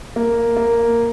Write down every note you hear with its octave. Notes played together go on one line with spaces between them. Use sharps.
A#3
A#3